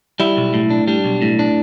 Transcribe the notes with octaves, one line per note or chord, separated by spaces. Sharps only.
G3 E4
B1
A2
D4
G3 D4
B1
A2
D4